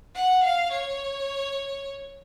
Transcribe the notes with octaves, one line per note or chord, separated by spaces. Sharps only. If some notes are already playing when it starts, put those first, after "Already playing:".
F#5
F5
C#5